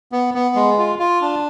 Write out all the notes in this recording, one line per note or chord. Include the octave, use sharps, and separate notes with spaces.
B3
B3
G#3
F4
F4
D4